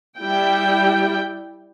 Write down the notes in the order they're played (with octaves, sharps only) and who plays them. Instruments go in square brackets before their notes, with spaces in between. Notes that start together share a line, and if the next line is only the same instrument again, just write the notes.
[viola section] G3 E4 G5